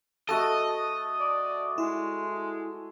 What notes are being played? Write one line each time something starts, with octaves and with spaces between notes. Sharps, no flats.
A3 F#4 A4 D#5 A5 D#6
D5
G#3 E4